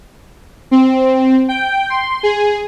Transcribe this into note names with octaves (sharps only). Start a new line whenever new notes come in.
C4
G5
C6
G#4